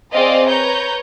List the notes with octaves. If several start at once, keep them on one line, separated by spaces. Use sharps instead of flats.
C4 G#4 C5 D5 D#5 F5
B4 C#5 A#5 G6